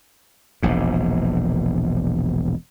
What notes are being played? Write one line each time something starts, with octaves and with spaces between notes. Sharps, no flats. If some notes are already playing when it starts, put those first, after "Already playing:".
E1 A#1 G#2